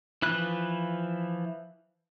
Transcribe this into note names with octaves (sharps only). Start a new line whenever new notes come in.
E3 F3 B4 F#6